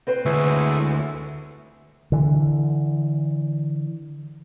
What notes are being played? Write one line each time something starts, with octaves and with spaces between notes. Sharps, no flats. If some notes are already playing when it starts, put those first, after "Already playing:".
C4 B4 C5
D2 G#3 E4 C#5
D3 E3